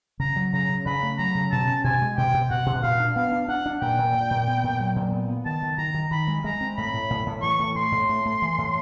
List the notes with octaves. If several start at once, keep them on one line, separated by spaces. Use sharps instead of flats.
C#3 A#5
F#3
C#3 A#5
C#3
C#3 B5
A3
F#3 A#5
C#3
B2 A5
C#4
B2 G#5
G#3
B2 G5
B2
B2 F#5
B2
A#2 F5
D4
B3 F5
D4
D4 F#5
D4
A#2 G5
A#2
A#2
A#2
B3
A#2
F#3
A#2
B3
B3
D#3 A5
D#3
D#3 A#5
D#3
D#3 B5
G#3
G#3 A#5
C4
A2 B5
A2
A2
A2
E3 C#6
A2
A3 C6
A2
A3
A3
E3
A2